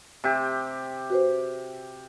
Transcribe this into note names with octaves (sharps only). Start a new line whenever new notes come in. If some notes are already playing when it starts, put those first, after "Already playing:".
C3 G4
F#4 B4 C5